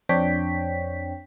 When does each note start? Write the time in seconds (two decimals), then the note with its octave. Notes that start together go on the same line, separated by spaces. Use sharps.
0.09 F2 C4 D4 C#5 G5 B6